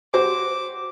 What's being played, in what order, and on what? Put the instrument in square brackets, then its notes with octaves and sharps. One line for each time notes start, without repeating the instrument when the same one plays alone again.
[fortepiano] F#4 G4 C5 [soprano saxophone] D6